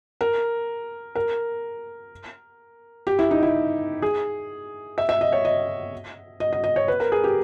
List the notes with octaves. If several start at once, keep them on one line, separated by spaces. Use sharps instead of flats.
A#4
A#4
G4
E4
D#4
E4
G#4
E5
E5
D#5
C#5
D#5
D#5
D#5
D#5
C#5
B4
A#4
G#4
G4